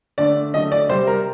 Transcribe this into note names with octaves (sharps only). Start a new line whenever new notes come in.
D3 A3 D5
D3 F#3 A3 D#5
D5
C3 G3 C5
A#4